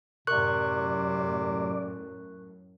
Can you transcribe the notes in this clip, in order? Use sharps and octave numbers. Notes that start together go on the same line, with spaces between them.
F#2 A2 C3 A#4 D5 C#6 F#6